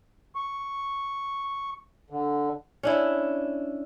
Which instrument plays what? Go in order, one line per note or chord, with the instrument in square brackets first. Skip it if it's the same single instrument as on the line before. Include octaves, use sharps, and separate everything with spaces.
[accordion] C#6
D3
[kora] C#4 D4 E4